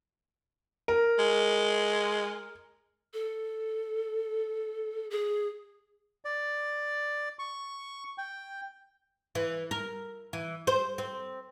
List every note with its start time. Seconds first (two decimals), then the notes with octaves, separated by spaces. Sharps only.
0.88 A#4
1.19 G#3
3.14 A4
5.11 G#4
6.25 D5
7.39 C#6
8.18 G5
9.35 E3
9.71 A#4
10.33 E3
10.67 C5
10.98 C4